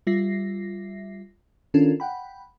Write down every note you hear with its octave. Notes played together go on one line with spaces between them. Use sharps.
G3 F4 E5 A#6 C7
D#3 C#4 D4 F4 A4 A#4
F#5 G5 B5